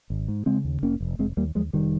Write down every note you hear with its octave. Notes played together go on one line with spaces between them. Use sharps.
G#1
G#2
C#3 G#3 C4
D#2
F1 A#3 C#4
F1
F1 G#3 C4
D#2 G3 A#3
D#2 F3 G#3
F1 D#3 G3